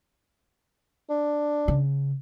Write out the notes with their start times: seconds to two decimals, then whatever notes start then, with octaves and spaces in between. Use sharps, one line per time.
1.10 D4
1.68 C#3